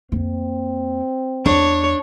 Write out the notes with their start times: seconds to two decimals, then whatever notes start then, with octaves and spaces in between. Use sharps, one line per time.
0.12 F2 A#3 C4
1.46 E2 D4 C#5